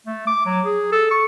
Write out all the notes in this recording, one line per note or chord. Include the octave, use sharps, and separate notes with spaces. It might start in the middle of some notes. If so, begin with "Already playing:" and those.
A3
D6
F#3
G#4
A4
C#6